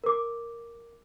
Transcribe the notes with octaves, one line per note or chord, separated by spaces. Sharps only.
A#4 D6